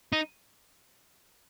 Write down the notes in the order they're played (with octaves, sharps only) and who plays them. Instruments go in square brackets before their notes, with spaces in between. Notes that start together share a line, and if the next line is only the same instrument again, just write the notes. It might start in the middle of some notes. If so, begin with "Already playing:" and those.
[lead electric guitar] D#4